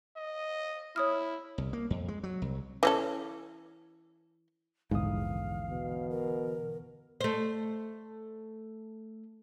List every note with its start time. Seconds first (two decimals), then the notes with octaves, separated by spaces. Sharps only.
0.16 D#5
0.96 E4 C#5 D#6 F6
1.58 C2
1.73 A#3
1.90 F2
2.08 G#3
2.23 F#3
2.42 C2
2.83 E3 C#4 A4
4.91 A#1 E2 G#2 D3 E3 F5 D#6
5.70 B2
6.10 A#4
7.21 A3 C5